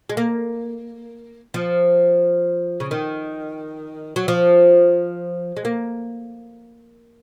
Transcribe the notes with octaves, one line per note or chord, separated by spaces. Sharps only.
G#3
A#3
F3
C#3
D#3
F#3
F3
G#3
A#3